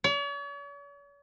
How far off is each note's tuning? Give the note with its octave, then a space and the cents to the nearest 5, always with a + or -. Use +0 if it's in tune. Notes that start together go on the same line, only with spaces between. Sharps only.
C#5 +45